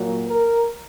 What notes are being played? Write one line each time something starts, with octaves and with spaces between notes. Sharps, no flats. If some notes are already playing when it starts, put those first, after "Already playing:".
Already playing: A#2 F#3 A#3
A#4